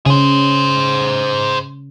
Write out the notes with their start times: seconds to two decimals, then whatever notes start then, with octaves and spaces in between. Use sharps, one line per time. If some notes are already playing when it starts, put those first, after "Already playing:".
0.06 C#3 G#4 C5